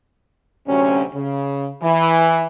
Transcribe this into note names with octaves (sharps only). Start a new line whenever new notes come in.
D2 C3 F#3 C#4
C#3
E3